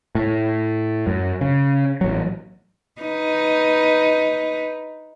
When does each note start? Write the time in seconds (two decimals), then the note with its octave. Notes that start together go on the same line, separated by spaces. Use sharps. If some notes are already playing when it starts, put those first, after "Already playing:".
0.15 A2
1.07 F#2
1.41 C#3
2.01 A1 F#3
3.02 D#4 B4